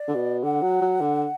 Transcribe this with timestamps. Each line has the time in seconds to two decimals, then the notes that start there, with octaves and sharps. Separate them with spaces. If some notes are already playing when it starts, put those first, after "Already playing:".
Already playing: D5
0.08 D3
0.15 B2
0.43 D3 F#5
0.62 F#3
0.82 F#3
1.01 D3